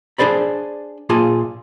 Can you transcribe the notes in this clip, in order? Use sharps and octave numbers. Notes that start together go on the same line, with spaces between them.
D4 G#4 C5 D5 B5
A#2 F4 G#4 A5